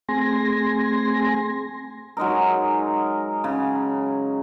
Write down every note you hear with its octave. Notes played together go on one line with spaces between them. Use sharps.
A3 C4 G#4 G#5 C6 A#6
F#3 G#3 D#4 A#4
C#3